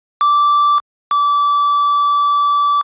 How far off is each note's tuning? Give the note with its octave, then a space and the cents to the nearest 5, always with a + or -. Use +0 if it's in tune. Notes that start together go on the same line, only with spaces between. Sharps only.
D6 -10
D6 -25